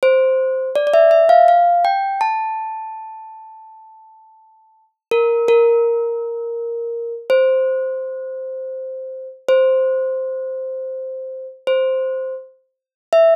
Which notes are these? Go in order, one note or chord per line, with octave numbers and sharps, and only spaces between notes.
C5
D5
D5
E5
E5
F5
F5
G5
A5
A#4
A#4
C5
C5
C5
E5